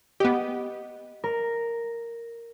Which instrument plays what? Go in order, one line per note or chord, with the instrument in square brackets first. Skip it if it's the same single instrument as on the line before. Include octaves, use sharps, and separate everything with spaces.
[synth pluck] B3 G4 [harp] D#5
[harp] A#4